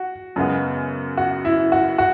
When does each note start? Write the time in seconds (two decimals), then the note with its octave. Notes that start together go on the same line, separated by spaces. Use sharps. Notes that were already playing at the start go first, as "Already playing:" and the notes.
Already playing: F#4
0.36 F#2 C#3 G#3 B3
1.17 F#4
1.45 E4
1.72 F#4
1.98 F#4